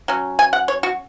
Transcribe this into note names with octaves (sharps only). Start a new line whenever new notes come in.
F#3 C#4
G#5
F#5
C#5
F#4